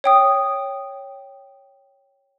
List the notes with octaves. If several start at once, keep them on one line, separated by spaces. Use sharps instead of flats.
C#5 G5 D#6